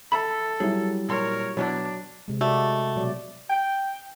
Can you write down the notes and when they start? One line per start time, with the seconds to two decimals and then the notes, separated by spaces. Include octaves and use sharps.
0.12 A4 E5 B5
0.60 F#3 G3 E4 G#4
1.09 A#2 A#4 C#5 C6
1.57 B2 F#3 B3 D4 E4
2.28 C3 G#3
2.41 A3 F#4 G4 D5
2.96 B2 F#3 D5
3.50 G5